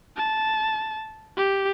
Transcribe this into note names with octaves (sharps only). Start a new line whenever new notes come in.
A5
G4